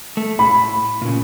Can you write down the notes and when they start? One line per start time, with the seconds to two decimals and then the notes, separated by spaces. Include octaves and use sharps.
0.17 A3
0.39 A2 B5
1.02 A#2 C#3